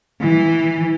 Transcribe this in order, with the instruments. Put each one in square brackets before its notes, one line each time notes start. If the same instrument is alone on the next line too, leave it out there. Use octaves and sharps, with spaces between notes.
[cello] E3